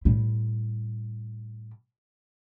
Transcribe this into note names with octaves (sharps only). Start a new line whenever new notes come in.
A2 G3